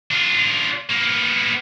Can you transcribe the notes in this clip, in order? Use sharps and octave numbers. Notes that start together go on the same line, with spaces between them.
D4 F4
A#3 B3